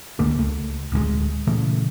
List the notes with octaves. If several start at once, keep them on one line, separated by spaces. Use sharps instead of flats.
C#2 D3 A3 A#3
C#2 A3
D1 D2 F3 G#3
A#2 C#3 E3 A3